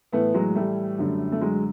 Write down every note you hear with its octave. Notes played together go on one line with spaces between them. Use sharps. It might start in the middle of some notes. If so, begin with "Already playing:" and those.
A2 E3 A3 B3
F#3 G#3
G3 A3
F#2 D3
A3
F#3 G#3